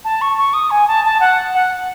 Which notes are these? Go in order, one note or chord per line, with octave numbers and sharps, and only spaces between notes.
A5
C#6
C#6
D#6
G#5
A5
A5
F#5
F#5